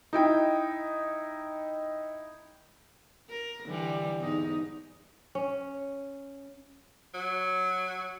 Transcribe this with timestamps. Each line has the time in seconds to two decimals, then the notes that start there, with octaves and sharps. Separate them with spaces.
0.13 D#4 E4 G5
3.29 A#4
3.65 D3 E3 G3
4.19 E2 G#2 D#4
5.35 C#4
7.14 F#3